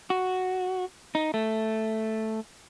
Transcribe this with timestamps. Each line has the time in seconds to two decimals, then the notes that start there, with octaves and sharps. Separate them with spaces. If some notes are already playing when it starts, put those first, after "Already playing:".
0.10 F#4
1.15 D#4
1.34 A3